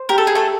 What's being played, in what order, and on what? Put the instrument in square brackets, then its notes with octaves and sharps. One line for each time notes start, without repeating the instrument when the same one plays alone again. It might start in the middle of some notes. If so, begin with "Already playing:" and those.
Already playing: [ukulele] C5
[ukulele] G4 [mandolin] A#4
[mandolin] A4
G#4
A3 A4